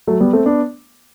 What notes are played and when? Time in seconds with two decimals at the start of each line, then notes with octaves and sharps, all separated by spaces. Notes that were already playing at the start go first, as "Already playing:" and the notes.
0.07 F#3 A3
0.20 G3 B3
0.33 A3 C4
0.46 B3 D4